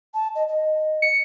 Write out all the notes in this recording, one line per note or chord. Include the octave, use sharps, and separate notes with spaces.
A5
D#5
D#5
C#7